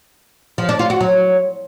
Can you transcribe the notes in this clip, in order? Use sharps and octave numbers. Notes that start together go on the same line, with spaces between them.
F3
D4
F4
F#4
F#3